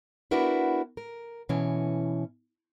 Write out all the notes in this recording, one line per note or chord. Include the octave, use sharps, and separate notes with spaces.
B3 D4 E4 F#4 A#4 B4
A#4
B2 E3 C#4